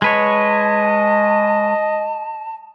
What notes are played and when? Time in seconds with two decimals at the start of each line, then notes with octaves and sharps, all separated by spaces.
0.02 G#3 B4 C#5 D#5 A5